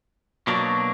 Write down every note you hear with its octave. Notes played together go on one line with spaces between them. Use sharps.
B2 F#3 A#3 D4